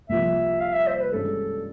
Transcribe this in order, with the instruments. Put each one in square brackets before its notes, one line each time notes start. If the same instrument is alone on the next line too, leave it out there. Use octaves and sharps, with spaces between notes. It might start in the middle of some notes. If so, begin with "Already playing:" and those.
[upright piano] C2 A#2 F3 [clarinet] E5
[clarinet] F5
E5
C5
B4
[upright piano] G2 E3 G#3 C#4 [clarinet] A4